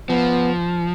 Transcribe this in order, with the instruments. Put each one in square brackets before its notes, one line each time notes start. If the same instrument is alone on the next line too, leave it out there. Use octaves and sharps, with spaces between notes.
[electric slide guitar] F3 [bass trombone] B3